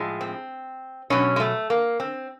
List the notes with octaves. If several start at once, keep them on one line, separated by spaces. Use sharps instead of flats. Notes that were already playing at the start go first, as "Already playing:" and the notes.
Already playing: A2 F3 G#3
C4
B2 F#3 C#4
G#3
A3
A#3
C4